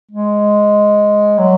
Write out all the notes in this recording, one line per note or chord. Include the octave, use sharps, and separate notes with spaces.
G#3
F#3